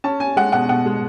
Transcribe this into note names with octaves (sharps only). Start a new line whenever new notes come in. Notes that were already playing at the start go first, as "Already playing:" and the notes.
C#4 A5
C#4 G#5
G#3 F#5
B2 F#5
B2 F#5
G#3